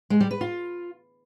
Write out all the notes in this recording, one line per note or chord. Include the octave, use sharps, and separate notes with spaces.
G#3
G3
B4
F4